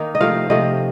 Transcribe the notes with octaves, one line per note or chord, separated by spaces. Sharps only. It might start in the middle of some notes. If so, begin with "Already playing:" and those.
Already playing: D#3 A#3 D#4
D#5
C3 F3 A3 F5
C3 F3 A3 D#5